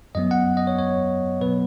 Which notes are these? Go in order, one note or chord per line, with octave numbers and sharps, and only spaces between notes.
F#2 F#3 B3 D#5
F#5
D#5
C#5
C#5
B2 F#3 B3 B4